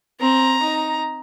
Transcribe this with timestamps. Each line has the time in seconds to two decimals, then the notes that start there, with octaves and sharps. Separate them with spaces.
0.21 C4 A#5
0.63 D#4